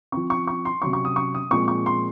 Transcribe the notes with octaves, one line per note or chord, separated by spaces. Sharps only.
F3 C4 C#6
C#6
C#6
C6
C3 F#3 C#4 C#6
C#6
D#6
C#6
D#6
A#2 F3 G#3 C4 C#6
C#6
C6